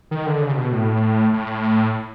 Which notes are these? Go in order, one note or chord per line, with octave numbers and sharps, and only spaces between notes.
D#3
D3
C#3
C3
B2
A2
A2